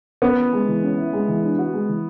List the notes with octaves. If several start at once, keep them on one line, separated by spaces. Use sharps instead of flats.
B3 C#4
E4
G#3
E3
C#4
E4
G#3
E3
D4
F#4
G#3
E3